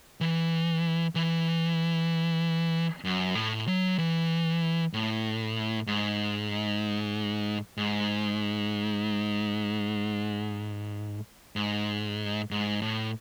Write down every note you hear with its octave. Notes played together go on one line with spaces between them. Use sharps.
E3
E3
F#2
A2
F#3
E3
A2
G#2
G#2
G#2
G#2
A2